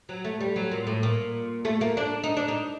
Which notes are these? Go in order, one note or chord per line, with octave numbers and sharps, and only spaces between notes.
F#3
A3
G3
F#3
A#2
A2
A#2
A3
A#3
D4
D#4
D4
D#4